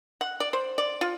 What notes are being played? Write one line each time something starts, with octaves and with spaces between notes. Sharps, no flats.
F#5
D5
C5
D5
F4